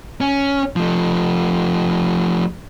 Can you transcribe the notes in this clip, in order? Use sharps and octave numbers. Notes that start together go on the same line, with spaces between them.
C#4
F3 A3